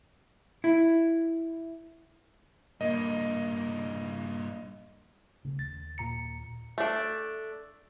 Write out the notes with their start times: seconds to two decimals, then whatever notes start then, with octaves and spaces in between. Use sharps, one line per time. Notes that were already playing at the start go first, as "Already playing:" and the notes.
0.64 E4
2.81 G2 A#2 A#3 D#5
5.45 C#3 A3
5.59 D#2 A6
5.98 A#2 A#5 C#7
6.78 A3 D4